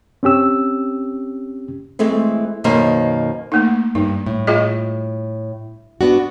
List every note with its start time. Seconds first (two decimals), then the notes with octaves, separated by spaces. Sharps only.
0.23 C4 C#4 G4 E6
1.99 E3 G#3 A3 C4
2.64 F#2 B2 D#3 A#3 C5
3.52 A3 A#3 D#4
3.95 G2 D#4
4.26 A2
4.47 F4 G#4 D#5
6.01 B3 D4 F#4